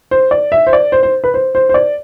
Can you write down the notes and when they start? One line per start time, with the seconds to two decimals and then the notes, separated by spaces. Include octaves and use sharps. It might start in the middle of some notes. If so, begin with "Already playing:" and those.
0.11 C5
0.31 D5
0.52 E5
0.67 C5
0.73 D5
0.92 C5
1.03 C5
1.24 B4
1.34 C5
1.55 C5
1.69 C5
1.74 D5